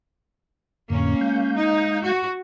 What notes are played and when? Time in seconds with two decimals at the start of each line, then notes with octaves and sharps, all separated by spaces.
0.90 F2 A2 D3 A#3 C#4
1.21 G#3 F5 G6
1.57 D#4
2.04 F#4